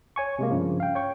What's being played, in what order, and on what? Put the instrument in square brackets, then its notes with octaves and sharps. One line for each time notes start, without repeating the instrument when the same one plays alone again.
[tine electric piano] C#5 G#5 C#6
C3 G#3 A#3
G2 C#3 F3
F5 G5
C#5 G5 C#6